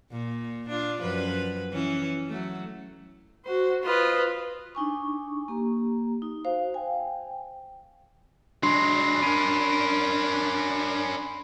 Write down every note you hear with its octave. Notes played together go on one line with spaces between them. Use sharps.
A#2
D4 F4
F#2 F3 B4
E3 C#4
F#3 A3
F#4 C5
F4 B4 C5 D#5
D4 D#4 G#5 C#6
A#3 G4 A#5
D#4
F#4 C5 F5
G5 G#5
F#3 G#3 D4 B5 C6 C7
C#4 A#4 B5 D7 D#7